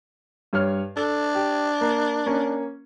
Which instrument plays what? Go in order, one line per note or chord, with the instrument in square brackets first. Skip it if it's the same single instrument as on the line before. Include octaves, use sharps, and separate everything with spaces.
[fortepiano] G2 C#5 F6
[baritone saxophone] D4 [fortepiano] A4
[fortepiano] G4
A#3
A#3 C#4